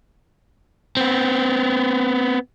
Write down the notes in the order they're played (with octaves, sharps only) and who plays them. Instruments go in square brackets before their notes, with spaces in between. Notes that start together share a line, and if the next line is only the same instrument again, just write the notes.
[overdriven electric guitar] B3 C4